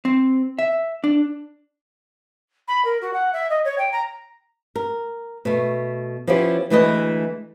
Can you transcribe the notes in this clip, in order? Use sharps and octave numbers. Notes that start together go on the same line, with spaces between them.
C4
E5
D4
B5
A#4
F#4
F#5
E5
D#5
C#5
G5
A#5
A#4
B2 A3
F3 B3 C#4 E4 G4
D2 E3 G#3 A3 B4 D#5